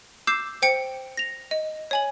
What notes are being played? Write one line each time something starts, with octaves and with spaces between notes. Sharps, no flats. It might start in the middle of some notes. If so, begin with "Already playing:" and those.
D6 E6 G6 C7 E7
C5 G5 C#7
A#6 F7
D#5
C#5 G#5 F#7